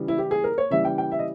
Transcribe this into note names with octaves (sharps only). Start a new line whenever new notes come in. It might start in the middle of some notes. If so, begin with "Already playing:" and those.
Already playing: C#3 E3 G3
E4
G4
G#4
A#4
C#5
C#3 E3 G3 E5
G5
G5
E5
D#5